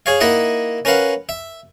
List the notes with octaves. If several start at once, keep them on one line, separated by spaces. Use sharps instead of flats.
G#4 C#5 F5
A#3 D#4 E4 D#5 E5 F#5
C#4 A#4 B4 F5 F#5
E5